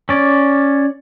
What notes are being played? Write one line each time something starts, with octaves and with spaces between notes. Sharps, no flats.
C#4 D5